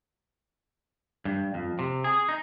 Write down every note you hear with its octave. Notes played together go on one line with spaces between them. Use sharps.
G2
F2
C3
G#4
D#4